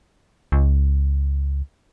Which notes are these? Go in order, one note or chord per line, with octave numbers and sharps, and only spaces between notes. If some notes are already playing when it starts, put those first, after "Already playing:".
C#2